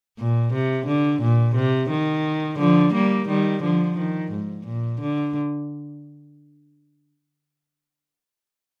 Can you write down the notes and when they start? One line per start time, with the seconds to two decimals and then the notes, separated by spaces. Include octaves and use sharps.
0.19 A#2
0.53 C3
0.87 D3
1.22 A#2
1.56 C3
1.90 D#3
2.59 D3 F3
2.93 G3 A#3
3.29 D#3 G3
3.63 D3 F3
3.97 D#3
4.32 G#2
4.67 A#2
5.01 D3